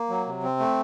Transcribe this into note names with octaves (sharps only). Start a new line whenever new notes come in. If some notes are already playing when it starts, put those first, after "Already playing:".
Already playing: A#3
F#3
C3
C4
A3